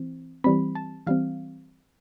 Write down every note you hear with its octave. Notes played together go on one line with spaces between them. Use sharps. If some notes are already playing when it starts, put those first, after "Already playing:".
Already playing: E3 C4
E3 G3 C4 B5
A5
E3 G3 C4 F5